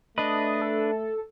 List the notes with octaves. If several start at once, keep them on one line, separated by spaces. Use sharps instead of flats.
A3 D4 B4 D#5
A4